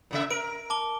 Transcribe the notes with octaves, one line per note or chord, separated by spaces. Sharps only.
A#2 C#3 E5
A#4 D7
A5 D6 G7